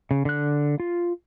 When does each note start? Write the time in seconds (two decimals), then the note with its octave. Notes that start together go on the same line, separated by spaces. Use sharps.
0.11 C#3
0.25 D3 F#6
0.80 F4